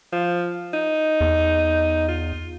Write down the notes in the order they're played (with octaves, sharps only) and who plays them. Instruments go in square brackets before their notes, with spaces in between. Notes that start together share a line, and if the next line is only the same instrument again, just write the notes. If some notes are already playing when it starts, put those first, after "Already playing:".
[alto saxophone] F3
D#4
[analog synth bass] E2
[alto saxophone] F4